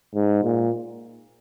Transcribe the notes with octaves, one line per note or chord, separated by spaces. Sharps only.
G#2
A#2